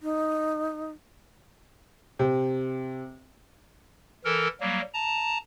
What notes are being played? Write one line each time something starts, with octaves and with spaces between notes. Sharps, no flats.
D#4
C3
E3 A4 A#4
F#3 G3 A#3
A5 A#5